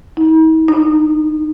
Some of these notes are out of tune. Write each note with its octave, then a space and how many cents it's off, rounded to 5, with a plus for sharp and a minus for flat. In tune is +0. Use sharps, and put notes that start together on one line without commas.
D#4 +45
D#4 -25